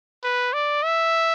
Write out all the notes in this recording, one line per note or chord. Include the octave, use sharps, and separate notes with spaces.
B4
D5
E5